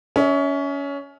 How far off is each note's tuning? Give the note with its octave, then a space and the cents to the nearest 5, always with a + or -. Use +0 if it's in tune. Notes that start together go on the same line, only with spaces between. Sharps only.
C#4 +20 E5 -35